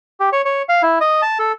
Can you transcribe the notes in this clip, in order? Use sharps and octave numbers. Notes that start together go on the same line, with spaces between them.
G4
C#5
C#5
F5
E4
D#5
A5
A4